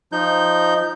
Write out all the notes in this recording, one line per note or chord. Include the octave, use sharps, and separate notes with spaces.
F3 D#4 G6